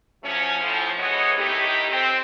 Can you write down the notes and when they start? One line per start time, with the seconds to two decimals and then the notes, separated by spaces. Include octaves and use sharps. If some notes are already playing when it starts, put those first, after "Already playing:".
0.23 F3 F#3 A3 C#4
0.60 A2 F3
0.98 E3 G#3 B3 F#4 C#5 D#5
1.38 A2 D#3 D#4 E4 G4
1.90 C4